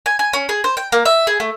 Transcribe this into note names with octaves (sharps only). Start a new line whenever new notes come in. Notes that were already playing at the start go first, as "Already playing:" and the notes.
G#5
G#5
C#4
G#4
C5
G5
A#3
E5
G#4
A3